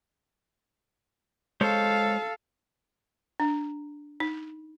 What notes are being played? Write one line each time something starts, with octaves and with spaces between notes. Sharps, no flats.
G#3 A4 C5 C#5 F5
D4
D#4